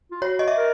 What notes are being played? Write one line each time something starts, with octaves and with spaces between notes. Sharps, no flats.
F4
F#4 C#5
D#5
E5
A#4